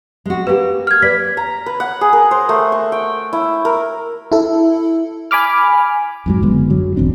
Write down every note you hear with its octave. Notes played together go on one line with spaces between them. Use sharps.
G#3 F#4
A#3 G4 B4
F6 G#6
B4 D5 B6
A#5
B4
F#5
G#4
A#4
C5
A3
C#6
G5
E4
A#4
E4 A4
G#5 B5 D6 F6
F2 G#2 F#3
F#1 D3 G#3 B3
F#2 F#3
D#1 A1 C4 D4